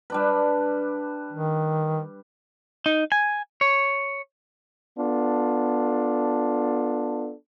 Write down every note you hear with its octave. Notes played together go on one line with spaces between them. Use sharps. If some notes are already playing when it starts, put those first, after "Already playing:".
G3 D4 B4
D#3
D#4
G#5
C#5
B3 D4 F4 A4